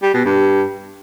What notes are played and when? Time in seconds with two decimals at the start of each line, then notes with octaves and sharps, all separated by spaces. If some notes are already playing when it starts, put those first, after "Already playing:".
0.02 G3
0.14 B2
0.25 G2